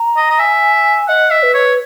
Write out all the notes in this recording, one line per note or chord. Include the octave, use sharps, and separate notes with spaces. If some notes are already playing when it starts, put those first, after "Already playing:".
Already playing: A#5
D#5
D#5
E5 G#5
D#5 F#5
E5
B4
C#5